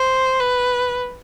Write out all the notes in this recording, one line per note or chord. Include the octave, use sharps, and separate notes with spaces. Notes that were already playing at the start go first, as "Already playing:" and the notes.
Already playing: C5
B4